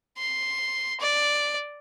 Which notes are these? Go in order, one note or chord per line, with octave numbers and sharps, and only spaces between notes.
C6
D5